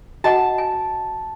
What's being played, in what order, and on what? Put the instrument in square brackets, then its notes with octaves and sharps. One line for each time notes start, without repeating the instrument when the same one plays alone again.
[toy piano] F#4 D#5 F#5 [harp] A5
[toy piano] G#5